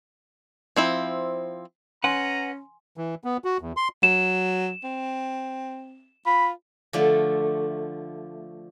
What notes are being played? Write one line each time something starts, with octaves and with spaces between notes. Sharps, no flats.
F3 C4 E4
C#4 B4 F#5 G#5 A#5 C6
E3
B3
F#4
E2
C6
F#3 E7
C4
F4 B5
D3 F3 A3